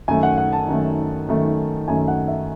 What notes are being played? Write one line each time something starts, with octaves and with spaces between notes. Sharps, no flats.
F#2 D#3 A3 G#5
F#5
F#5
A5
F#2 D#3 A3
F#2 D#3 A3
F#2 D#3 A3 G#5
F#5
E5